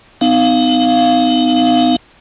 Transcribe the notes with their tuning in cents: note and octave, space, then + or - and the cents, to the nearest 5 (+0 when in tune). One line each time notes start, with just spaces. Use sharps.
B3 +40 D#4 -5 F5 +0